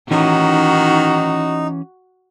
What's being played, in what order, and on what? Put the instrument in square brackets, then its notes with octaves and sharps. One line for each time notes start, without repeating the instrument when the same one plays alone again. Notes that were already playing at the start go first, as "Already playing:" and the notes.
[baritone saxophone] D#3 [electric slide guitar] E3 C#4 [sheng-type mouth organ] D#4 [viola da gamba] F#4